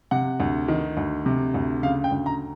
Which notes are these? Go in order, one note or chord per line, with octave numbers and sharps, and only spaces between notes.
C3 F#5
D2
D#3
D2
C3
D2
C#3 F5
G5
D2
A#5